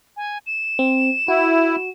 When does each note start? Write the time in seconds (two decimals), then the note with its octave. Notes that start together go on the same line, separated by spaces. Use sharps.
0.17 G#5
0.46 E7
0.79 C4
1.28 E4 F#4